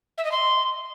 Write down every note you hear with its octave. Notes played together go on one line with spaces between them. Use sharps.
E5
D#5
C6